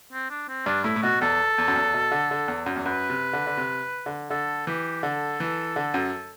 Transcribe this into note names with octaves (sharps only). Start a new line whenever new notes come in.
C4
D4
C4
G2 D4
A2 E4
A2
B2 F#4
E2 A4
E2
F#2
E2
B2
D3
D3
E2
F#2
E2
F#2 B4
C3
D3
D3
C3
D3
D3 A4
E3 G4
D3 A4
E3
D3
F#2